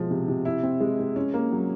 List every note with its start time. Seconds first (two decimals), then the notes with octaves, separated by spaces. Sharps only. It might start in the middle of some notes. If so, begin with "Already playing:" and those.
Already playing: B2 F3 G#3
0.11 C3
0.28 C3
0.45 E4
0.63 C4
0.80 G#3
0.99 G#3
1.16 C#4
1.34 A#3
1.52 F#3